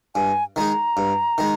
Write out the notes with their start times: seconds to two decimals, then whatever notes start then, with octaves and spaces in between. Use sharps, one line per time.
0.15 G2 G#5
0.56 D#3 G#3 D#4 A#5
0.97 G2
1.38 D#3 G#3